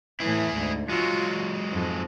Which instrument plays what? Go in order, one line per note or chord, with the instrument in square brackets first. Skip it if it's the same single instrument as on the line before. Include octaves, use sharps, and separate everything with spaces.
[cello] A2 E3 [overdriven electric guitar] E4 G#4
[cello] D2 G#2
[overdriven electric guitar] F#3 G#3 [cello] F4 F#4
[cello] F2 G#2